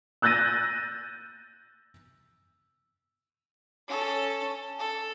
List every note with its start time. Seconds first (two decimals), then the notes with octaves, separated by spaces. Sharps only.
0.22 E6 F#6 G6 A6 A#6 D#7
3.88 C#4 A4
4.79 A4